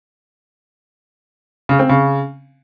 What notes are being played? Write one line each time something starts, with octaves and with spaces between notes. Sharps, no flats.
C#3
C4
C#3